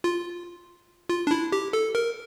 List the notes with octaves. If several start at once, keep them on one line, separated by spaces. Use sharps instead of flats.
F4
F4
D4
E4
G4
A4
A#4